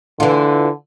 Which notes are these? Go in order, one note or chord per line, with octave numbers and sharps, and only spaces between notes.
D3 E3 F4